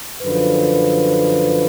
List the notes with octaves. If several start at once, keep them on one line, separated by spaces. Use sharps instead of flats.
F#2 D3 F3 B4